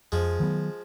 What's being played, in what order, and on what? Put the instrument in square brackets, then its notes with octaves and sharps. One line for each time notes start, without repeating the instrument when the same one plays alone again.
[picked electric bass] F2 [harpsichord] F3 G#3
[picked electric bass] D#3 F#3 B3